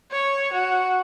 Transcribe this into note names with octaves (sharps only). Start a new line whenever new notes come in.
C#5
F#4